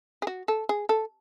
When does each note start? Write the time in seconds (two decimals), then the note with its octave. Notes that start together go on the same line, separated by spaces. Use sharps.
0.22 G#4
0.27 F#4
0.48 A4
0.69 G#4
0.89 A4